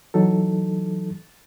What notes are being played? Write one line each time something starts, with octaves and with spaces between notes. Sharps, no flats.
E3 F#3 D#4 A4